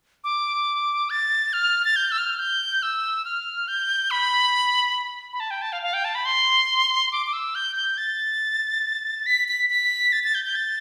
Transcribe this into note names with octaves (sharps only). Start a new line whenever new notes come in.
D6
A6
F6
A6
G6
E6
F6
G6
E6
F6
G6
B5
B5
A5
G5
A5
F5
F5
G5
A5
B5
C6
D6
D6
E6
G6
G6
A6
B6
B6
B6
A6
A6
G6
G6
A6